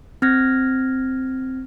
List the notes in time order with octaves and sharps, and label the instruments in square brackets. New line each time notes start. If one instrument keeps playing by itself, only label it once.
[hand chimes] C4 F6 G#6 A#6